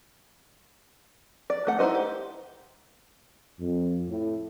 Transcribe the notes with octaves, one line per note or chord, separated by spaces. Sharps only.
D5
A3 F#5
D#4 E4 B4 C5 D#5
G4
F2
A2